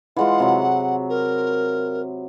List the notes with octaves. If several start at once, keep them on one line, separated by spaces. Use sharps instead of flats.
E3 G#3 F4 F#5
C3 F#3
A#4